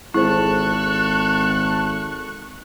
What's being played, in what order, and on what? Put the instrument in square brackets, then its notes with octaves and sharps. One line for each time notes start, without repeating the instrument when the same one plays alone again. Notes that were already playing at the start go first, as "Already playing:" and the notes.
[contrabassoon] G#1 [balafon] E4 G#4 C5 [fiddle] A4 [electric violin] C#6 F#6